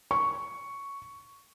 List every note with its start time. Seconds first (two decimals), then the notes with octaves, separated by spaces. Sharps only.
0.11 C#6